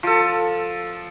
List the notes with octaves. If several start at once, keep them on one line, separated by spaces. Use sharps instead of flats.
F3 A4